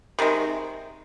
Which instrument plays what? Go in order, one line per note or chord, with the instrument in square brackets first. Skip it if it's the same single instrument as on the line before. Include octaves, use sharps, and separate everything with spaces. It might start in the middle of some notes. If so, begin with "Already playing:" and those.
[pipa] C3 D#3 G#3